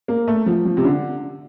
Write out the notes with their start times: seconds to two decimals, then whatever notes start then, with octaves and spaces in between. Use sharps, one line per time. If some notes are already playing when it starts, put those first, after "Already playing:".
0.08 A#3
0.28 A3
0.46 F3
0.65 F3
0.77 C3
0.84 D3